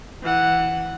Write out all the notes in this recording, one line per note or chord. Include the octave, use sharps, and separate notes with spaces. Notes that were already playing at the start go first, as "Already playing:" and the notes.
E3 F#5